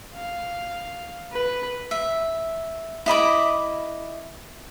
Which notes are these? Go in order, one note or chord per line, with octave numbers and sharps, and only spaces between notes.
F5
B4
E5
E4 D#5 B5 D6